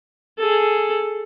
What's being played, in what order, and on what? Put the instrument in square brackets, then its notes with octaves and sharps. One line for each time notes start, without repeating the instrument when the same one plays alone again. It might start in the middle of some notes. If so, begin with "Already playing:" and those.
[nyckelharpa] G#4 A4